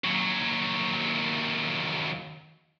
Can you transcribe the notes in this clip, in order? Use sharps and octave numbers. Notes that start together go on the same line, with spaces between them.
D#2 F#3